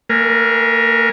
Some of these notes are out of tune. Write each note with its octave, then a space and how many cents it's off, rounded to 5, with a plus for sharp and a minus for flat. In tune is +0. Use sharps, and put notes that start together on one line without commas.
A#3 -30 A#4 +40 G#5 -5